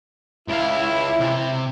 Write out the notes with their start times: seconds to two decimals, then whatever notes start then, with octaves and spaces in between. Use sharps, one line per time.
0.49 C#2 E4 F5
1.20 C3